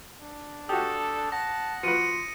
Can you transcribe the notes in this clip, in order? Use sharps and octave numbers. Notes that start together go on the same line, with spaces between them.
D4
F#4 G4 A4 D#6
F#5 A5 A#6
F3 F#4 B4 C6 C#7 D#7